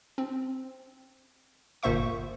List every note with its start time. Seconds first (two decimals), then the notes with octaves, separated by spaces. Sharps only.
0.18 C4
1.83 G1 A#2 A#3 C5 E5 C#6